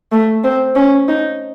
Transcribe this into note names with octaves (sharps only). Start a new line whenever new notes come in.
A3
C4
C#4
D#4